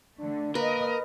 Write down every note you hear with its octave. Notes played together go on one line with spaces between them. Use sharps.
D3 A3 D4
A#3 A#4 B4 D#5